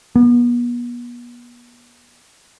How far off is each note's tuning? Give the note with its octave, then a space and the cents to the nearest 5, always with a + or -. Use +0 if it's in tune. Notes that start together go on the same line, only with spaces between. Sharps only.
B3 -40